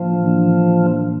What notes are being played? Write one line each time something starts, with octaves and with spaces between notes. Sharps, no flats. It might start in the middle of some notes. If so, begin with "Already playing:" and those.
Already playing: A2 E3 F3 A#3 D4
A2 E3 A#3 D4
A2 E3 A#3 D4